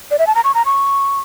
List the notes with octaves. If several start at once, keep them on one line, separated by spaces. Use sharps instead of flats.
D5
E5
A5
A#5
C#6
A#5
C#6